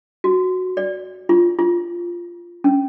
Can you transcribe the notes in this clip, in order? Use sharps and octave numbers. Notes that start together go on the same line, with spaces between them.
F#4
D5
F4
F4
C#4